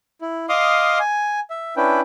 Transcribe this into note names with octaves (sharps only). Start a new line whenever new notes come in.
E4
D#5 F5 C6 D6 D#6 F6
G#5
E5
C#4 D4 E4 B4 G5